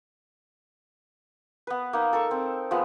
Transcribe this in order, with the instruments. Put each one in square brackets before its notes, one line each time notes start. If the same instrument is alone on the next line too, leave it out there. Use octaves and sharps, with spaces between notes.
[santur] B3 B4
A#3 D#4
A4 A#4 C#6
C4
F3 G#3 B3